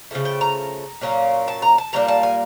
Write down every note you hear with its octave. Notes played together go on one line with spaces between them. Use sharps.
C#3 F3 A3
G5
A#5
A#2 F#3 A#3 C#4
A5
A#5
A5
A#2 G3 A#3 D4 A#5
A5
G#5